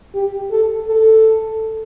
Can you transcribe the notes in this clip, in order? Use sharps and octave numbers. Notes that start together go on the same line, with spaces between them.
G4
A4
A4